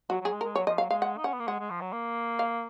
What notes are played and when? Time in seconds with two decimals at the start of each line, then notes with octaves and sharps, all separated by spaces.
0.10 F#3 F#4
0.21 F#3 G#4
0.33 G#3
0.41 A#4
0.44 G#3
0.55 F#3 C#5
0.67 F3 D#5
0.78 F#3 F5
0.90 G#3 F5
1.02 F#5
1.17 D#4
1.24 C#4 F#5
1.33 B3
1.40 A#3
1.48 G#3 F#5
1.59 G#3
1.70 F3
1.81 F#3
1.93 A#3
2.39 F5